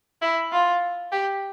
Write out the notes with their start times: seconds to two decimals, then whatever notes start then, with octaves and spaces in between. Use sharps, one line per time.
0.22 E4
0.52 F4
1.12 G4